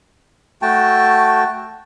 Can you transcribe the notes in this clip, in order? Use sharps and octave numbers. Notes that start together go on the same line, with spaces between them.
A3 F#4 G5 A5